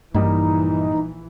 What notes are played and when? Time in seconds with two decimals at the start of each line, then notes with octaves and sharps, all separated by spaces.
0.14 A#1 G2 E3 G3 A#3 D#4